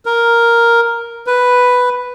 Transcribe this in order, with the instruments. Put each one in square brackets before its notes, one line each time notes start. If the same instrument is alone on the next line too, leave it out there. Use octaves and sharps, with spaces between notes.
[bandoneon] A#4
B4